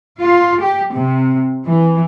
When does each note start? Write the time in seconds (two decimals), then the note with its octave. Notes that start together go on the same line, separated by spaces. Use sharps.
0.20 F4
0.61 G4
0.94 C3
1.66 E3